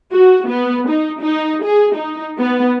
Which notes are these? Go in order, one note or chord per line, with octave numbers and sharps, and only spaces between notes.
F#4
B3
D#4
D#4
G#4
D#4
B3